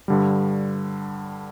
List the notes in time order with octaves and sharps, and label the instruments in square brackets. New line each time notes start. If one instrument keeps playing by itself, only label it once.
[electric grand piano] G2 D3 G3